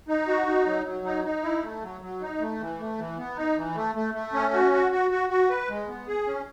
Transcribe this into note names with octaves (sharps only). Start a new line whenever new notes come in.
D#4
F#4
D#4
F#3
F#3
D#4
D#4
E4
A3
F#3
F#3
D#4
A3
E3
A3
E3
B3
D#4
E3
A3
A3
A3
C#4
F#4
F#4
F#4
F#4
F#4
B4
G#3
B3
G#4
C#4